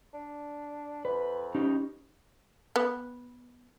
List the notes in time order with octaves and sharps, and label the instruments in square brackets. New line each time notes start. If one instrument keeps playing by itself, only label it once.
[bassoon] D4
[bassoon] F2 [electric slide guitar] B4
[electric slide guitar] C#4 D#4 G4
[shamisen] B3